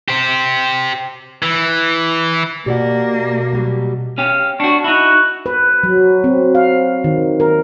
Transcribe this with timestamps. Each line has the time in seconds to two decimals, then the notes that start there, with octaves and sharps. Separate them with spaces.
0.08 G4 C5
1.43 E3
2.66 B2 A#3 G4 D5 F#5
3.53 F#3 G3 G4
4.18 C#4 G4 F5
4.60 D4 F#4 C#6
4.84 D#4 E4 F#4
5.46 B4
5.83 F#3
6.24 C4
6.55 F5
7.04 D#3
7.40 A#4